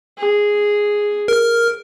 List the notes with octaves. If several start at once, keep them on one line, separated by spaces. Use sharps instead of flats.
G#4
A#4 F6